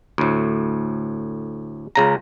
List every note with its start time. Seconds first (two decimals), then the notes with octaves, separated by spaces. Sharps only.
0.18 D2 A2
1.95 C#2 C#3 A#5